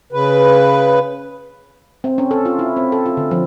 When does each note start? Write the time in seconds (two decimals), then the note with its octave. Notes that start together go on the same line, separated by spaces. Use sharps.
0.13 C#3 B4
2.04 C4
2.18 C#4
2.31 A4
2.45 F4
2.59 E4
2.77 C4
2.92 A4
3.06 F4
3.17 D3
3.31 F3